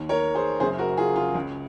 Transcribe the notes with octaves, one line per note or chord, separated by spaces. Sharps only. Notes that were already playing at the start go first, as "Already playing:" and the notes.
Already playing: D#2 D#3
A#4 C#5
G#4 C5
F#1 F#2 C#3 G#4 C5
F#4 A#4
F4 G#4
F4 G#4
C#2 C#3